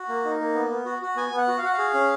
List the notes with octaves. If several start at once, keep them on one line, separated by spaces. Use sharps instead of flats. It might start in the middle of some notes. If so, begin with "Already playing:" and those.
Already playing: F#4
A#3
D#4
A#3
B3
B3
F#4
F#4
B3 G#5
B3
F#5
F#4
F5
F#4 F#5
F5
G#4
C#4